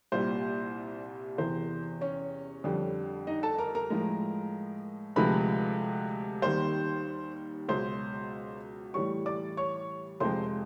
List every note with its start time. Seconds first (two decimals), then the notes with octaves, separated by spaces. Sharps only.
0.12 C2 A#2 G3 C5
1.38 E2 C3 E3 C5
2.01 C#4 C#5
2.64 F2 D3 G3
3.27 D#4 D#5
3.43 A4 A5
3.59 A#4 A#5
3.75 A#4 A#5
3.90 A2 F3 G#3
5.16 D2 C3 F3 G#3 B4 B5
6.42 D#2 D#3 G3 C5 C6
7.69 C#2 B2 F#3 C5 C6
8.94 A2 E3 G3 C#5 C#6
9.26 D5 D6
9.57 C#5 C#6
10.20 F2 C3 F3 G#3 C5 C6